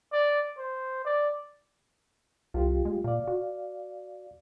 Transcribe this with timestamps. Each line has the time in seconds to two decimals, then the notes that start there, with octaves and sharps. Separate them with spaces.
0.12 D5
0.57 C5
1.05 D5
2.54 C2 F4 G4
2.85 G#3
3.04 A#2 D5 F5
3.28 F#4